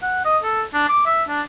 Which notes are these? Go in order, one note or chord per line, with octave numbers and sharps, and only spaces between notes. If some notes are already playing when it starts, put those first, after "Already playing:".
F#5
D#5
A4
D4
D6
E5
D4